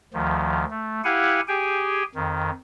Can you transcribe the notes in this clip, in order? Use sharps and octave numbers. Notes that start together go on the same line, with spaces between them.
D2 D#3 F3
A3
E4 G4 F5 F#5 G#5
G4 G#4 G5 G#5
F2 D#3